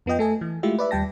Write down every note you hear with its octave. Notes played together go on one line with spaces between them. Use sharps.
F2 B3 F4 D#5 G5
A3 A4 G#5
E3
G#3 A3 E4 F4 G4 E5
B4 D5 E5
D#2 G3 G5 A5 A#6